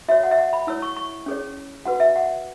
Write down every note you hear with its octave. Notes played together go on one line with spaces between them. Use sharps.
F#4 C#5 E5
F#5
E5
F#5
B5
E4 C#5 E6
C#6
C#6
C#4 G#4 C#5
F#4 B4 F#5
E5
F#5